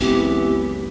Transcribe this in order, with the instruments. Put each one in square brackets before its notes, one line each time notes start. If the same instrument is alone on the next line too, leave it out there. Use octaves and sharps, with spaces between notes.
[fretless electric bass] F#1 C#2 C4 [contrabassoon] E3 [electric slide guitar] B3 [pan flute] G4